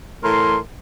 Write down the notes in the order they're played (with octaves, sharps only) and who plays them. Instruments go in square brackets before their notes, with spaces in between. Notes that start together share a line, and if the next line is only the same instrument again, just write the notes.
[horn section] A2 E3 A#4 A#5 C6